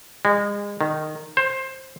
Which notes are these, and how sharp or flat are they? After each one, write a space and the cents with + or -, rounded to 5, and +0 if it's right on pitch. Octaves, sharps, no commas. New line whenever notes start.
G#3 -30
D#3 -15
C5 +15